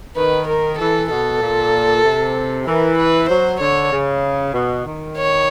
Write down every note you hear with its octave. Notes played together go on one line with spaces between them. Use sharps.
D#3 B4
A#4
E3 A4
B2 A4
A#2
C3
E3 A#4
B4
F#3 C5
D3 C#5
C#3
B2
D#3
C#5